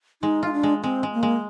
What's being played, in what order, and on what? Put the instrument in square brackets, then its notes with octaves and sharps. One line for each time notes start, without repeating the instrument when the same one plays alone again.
[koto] G#3 [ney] D#4
[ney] D#4 [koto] F4
[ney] D4
[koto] G#3
[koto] G#3 [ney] C4
[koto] G#3
[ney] A#3
[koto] G#3